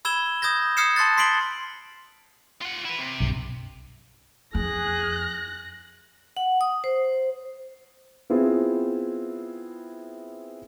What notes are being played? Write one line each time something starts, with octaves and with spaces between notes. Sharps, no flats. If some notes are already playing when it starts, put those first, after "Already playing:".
B5 E6 G#6 E7 G7
D#6 G6 G#6 A#6
D#6 F6 G#6 C7 C#7 E7
A5 C6 F#6 A6
C6 B6 C7 D7 F#7 G7
F4 F#5
E4 B4
C3
B1 G2
F2 G#4 F#6 A#6
F#5
D#6
C5
B3 C4 E4 F4 G#4